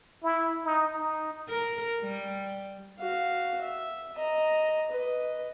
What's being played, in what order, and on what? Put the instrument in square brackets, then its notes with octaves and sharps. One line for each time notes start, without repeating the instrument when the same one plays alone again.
[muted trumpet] E4
D#4
D#4
[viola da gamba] A#4
G3
[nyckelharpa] F#4 F5
E5
D#5 A#5
B4 D#5